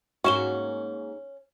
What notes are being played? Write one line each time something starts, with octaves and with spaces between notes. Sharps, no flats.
G#2 A#3 C#4 F#4 C#6 E7 G7